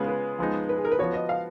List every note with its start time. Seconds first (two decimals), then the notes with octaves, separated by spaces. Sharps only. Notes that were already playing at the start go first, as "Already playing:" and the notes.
Already playing: C#3 G#3 B3 F4
0.08 B4
0.39 F3 G#3 B3 D#4
0.69 B4
0.76 G#4
0.85 A#4
0.92 B4
0.99 F3 B3 F#4 C#5
1.14 D#5
1.29 F5